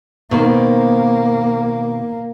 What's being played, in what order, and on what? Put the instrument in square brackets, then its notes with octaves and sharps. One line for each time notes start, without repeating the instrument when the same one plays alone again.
[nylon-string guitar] B2 D#3 C5 [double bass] A#3